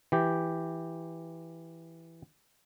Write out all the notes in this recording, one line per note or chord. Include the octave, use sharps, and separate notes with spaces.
E3 G4